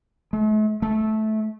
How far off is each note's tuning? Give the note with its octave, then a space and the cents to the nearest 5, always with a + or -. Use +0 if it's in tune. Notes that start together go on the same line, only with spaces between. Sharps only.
A3 -40
A3 -15